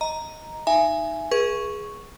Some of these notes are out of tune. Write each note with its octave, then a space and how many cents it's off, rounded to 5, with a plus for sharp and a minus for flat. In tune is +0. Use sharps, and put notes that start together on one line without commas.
D#5 +5 A#5 +0
D#4 +0 E5 +30 G#5 +0
G#4 +0 B4 -40 C#6 +0